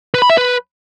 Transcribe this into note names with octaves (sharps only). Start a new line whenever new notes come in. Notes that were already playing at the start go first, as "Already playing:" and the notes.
B4
B5
E5
B4